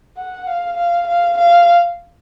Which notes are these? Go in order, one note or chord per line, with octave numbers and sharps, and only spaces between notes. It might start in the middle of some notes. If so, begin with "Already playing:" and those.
F#5
F5
F5
F5
F5